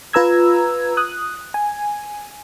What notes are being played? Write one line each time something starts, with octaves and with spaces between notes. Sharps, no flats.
F4 B4 A#5 E6 G#6
D#6 F#6
G#5